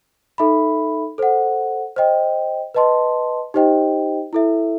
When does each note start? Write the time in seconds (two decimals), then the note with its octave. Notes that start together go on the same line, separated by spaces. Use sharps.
0.38 D#4 A4 E5 B5
1.18 A4 C5 F#5
1.96 C5 D#5 G5
2.74 B4 D#5 A5 C6
3.54 D#4 G4 C5 D#5 G5
4.33 E4 A4 E5